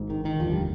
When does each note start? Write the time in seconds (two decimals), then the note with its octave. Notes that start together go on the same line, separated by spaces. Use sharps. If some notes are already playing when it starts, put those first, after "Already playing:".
Already playing: G#1 G#2
0.10 D#3
0.25 D#3
0.40 F1 D#2 D3 F3
0.51 G3